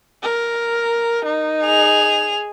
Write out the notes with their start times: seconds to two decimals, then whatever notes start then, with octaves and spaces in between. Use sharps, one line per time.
0.23 A#4
1.25 D#4
1.65 G#4 F7